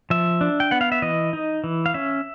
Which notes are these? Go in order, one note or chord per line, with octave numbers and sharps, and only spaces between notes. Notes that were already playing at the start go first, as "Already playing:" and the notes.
F3 E5
D4
G5
B3 F#5
F5
E5
E3 D#5
D#4
E3
F5
C#4 E5